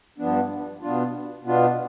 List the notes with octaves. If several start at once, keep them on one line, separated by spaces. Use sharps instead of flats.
G2 F3 B3 D4
B2 B3 D4 F4
B2 B3 D4 F4